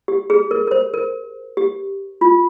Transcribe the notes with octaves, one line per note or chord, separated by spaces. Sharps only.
G4
G#4
A#4
A#4
C5
A#4
G4
F4